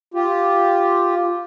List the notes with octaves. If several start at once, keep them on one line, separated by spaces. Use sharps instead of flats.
F4 G4